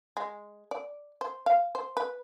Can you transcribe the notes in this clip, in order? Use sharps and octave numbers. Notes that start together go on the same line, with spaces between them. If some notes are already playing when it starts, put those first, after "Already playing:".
G#3
D5
C5
F5
C5
B4